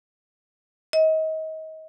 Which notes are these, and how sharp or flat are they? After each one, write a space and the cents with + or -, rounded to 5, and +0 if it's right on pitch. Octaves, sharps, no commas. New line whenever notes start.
D#5 +30